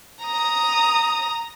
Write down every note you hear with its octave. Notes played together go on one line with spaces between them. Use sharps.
A#5 D#6